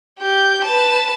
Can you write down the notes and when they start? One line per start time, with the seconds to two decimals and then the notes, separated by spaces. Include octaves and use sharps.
0.19 G4 G6
0.65 B4 A5